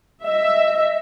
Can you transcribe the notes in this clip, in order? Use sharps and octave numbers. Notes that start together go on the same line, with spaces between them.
D#5 E5